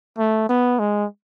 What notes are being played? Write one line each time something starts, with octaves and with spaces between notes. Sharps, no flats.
A3
B3
G#3